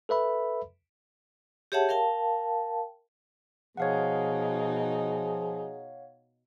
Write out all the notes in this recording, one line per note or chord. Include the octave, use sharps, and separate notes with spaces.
A4 B4 E5 B5
G4 G#4 C#5 E5 F#5 A5
A#4 F5 G5 A5
B2 F3 D#4 G#4 C#5 F5 F#5